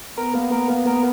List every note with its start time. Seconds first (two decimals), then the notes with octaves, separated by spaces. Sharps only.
0.18 B3 A#4
0.35 A#3
0.52 A#4
0.70 A#3
0.87 A#4